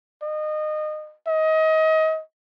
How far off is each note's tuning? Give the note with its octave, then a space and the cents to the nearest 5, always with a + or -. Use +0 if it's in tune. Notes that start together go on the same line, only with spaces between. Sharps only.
D#5 -25
D#5 +30